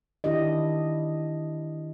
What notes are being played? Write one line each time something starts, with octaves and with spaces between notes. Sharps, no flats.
D#3 D4 E4 G4 D#5